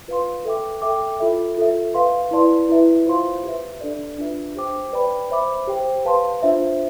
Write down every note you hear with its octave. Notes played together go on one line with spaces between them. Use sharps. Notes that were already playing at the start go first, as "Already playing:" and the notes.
F4 B4 F5 C6
A4 E5 G5 D6
A4 E5 G5 D6
F4 A4 E5
F4 A4 E5
B4 F5 C6
E4 B4 D5 A5 C6
E4 B4 E5
F4 C5 F5 C6
G4 B4 E5
D4 A4 D5
D4 F4 B4 E5
G4 C5 G5 D6
B4 D5 G5 B5
C5 E5 B5 D6
G4 C5 G5
B4 F5 A5 C6
D4 F4 C5 E5